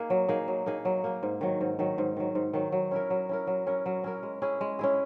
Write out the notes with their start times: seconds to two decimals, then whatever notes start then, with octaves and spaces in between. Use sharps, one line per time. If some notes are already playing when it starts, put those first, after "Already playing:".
Already playing: A#3 D#4 G#4
0.10 F#3
0.28 A#3 D#4 G#4
0.48 F#3
0.66 A#3 D#4 G#4
0.85 F#3
1.04 A#3 D#4 G#4
1.23 G#2
1.41 D#3 F#3
1.61 G#2
1.79 D#3 F#3
1.98 G#2
2.17 D#3 F#3
2.35 G#2
2.53 D#3 F#3
2.72 F#3
2.91 C#4 E4 A#4
3.10 F#3
3.29 C#4 E4 A#4
3.47 F#3
3.67 C#4 E4 A#4
3.86 F#3
4.04 C#4 E4 A#4
4.23 G#3
4.42 C#4 E4 G#4
4.61 G#3
4.79 C#4 E4 G#4